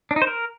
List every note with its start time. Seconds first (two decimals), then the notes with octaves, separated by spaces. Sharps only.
0.11 D4
0.16 D#4
0.22 C5
0.27 A#4